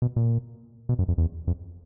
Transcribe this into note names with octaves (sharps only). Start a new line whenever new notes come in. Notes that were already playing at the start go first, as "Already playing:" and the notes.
B2
A#2
B2
F#2
F2
E2
F2